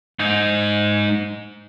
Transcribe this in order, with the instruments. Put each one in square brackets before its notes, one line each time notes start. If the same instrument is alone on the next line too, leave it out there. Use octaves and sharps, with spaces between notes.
[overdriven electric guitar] G#2 D#4